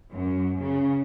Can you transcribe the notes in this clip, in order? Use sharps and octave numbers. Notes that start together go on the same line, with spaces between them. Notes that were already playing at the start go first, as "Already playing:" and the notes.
F#2
C#3